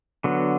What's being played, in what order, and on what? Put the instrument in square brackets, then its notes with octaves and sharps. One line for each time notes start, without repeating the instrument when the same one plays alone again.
[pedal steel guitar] D3 F#3 B3